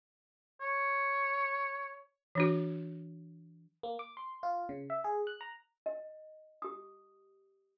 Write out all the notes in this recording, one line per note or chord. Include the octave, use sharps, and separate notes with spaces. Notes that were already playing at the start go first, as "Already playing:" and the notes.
C#5
E3 D4 F#4
A#3
D6
C6
F4
C#3
E5
G#4
F#6
A#5
D#5
G4 D#6